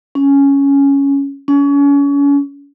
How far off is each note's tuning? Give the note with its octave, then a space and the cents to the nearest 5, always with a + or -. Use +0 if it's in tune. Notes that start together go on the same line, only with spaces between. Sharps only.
C#4 +5
C#4 +35